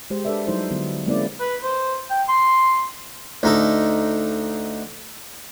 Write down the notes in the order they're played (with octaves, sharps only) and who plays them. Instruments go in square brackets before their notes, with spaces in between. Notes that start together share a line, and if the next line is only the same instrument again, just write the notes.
[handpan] G#3 G4 C5
D4 G4 A4 B4 D5 E5
F#3 G3 D#4 E4 C5
D3 F#3 B3
G#3 A#3 C4 C#4 E4 D5
[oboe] B4
C5
G5
C6
[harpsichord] D2 D#4 A4